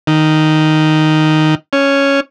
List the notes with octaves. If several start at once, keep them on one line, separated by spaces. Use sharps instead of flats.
D#3
C#4